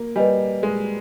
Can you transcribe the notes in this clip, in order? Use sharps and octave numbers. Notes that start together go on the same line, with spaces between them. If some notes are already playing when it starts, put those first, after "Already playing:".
Already playing: A#3
G3 B4 D#5 G#5
G#3